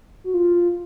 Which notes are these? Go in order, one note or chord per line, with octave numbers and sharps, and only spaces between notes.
F#4
F4